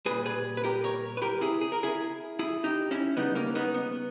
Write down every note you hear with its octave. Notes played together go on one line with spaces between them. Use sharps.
A#2 G3 G#4 B4
G#4 B4
B4
G4 A#4
A#4 C#5
B4
G4 A#4
E4 G#4
G#4
A#4
E4 G#4
E4 G#4
D#4 G4
C#4 E4
C#3 G3 B3 D#4
A#3 C#4
B3 D#4
B3